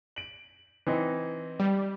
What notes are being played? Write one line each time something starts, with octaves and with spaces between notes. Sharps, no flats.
D7 F#7
E3 C4 D#4
G3